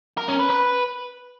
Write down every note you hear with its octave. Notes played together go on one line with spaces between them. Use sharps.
A#4
C#4
B4
B4